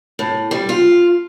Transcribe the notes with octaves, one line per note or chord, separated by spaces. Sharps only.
A2
G3
F4